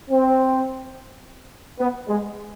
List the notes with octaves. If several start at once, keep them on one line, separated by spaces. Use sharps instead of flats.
C4
B3
G#3